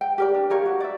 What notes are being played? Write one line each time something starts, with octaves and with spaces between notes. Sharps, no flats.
G5
G4 A#4 D5
D4
G4 A#4 C#5 F5
F#4
D5 E5